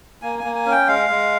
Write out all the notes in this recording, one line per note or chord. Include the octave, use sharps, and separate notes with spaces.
A#3 G#5
A#3 G#5
G#5
C#4
G5
G#3 F5
G#3